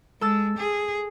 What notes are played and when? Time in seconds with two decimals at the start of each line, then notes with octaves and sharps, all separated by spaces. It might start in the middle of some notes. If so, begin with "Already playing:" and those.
0.21 G#3 A4 E6 A6
0.58 G#4